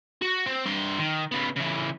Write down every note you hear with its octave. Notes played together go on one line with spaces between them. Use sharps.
F#4
C4
G2 C6
D#3
C#3 B3
C#3 E3